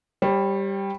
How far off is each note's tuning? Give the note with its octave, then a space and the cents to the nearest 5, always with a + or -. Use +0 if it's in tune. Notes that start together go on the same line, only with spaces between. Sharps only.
G3 +5 C#5 -45